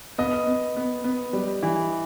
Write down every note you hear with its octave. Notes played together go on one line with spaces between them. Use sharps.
B3 D#5
B3
B3
B3
G3
E3